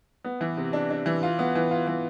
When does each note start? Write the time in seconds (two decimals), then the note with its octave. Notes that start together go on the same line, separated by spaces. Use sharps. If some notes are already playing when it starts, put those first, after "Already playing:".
0.24 B3
0.41 E3
0.57 C3
0.73 D4
0.90 D4
1.06 E3
1.23 F4
1.39 B3
1.55 E3
1.71 F4
1.87 E3